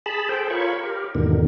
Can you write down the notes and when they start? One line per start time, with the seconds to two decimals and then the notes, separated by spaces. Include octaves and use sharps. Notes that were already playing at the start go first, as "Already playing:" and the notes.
0.06 G#4 A5 B5
0.29 G#4 A4 C5 G5
0.50 F4 A#4 C#5 B5 C#6
0.83 G4 A#4
1.15 E2 G#2 B2 D3 D#3